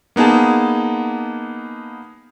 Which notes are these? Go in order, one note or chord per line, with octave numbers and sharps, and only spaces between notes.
A#3 B3 D#4 G#4 A5